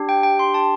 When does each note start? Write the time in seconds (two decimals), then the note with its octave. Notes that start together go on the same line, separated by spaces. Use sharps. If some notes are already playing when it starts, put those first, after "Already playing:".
Already playing: D4 G4
0.09 G5
0.23 G5
0.39 C6
0.54 A5